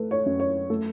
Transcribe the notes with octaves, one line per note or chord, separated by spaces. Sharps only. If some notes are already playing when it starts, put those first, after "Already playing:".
Already playing: A3 B4
C#5
F#2
C#5
A3 A4